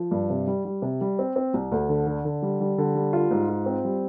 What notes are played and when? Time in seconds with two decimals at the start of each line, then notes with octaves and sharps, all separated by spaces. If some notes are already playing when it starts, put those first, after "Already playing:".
Already playing: F3
0.11 G2
0.30 C3
0.47 G3
0.65 G3
0.82 C3
1.01 G3
1.19 C4
1.36 C4
1.54 C2
1.72 D2
1.89 D3
2.07 D3
2.25 D3
2.42 G3
2.60 G3
2.78 D3
2.95 G3
3.13 F4
3.31 G#2
3.49 F4
3.66 C4
3.85 G3